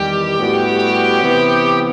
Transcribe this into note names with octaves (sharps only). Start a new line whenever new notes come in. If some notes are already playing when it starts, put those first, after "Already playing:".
Already playing: E2 D#3 G3 G4
A2 G3 B3 F#4
C3 E3 B3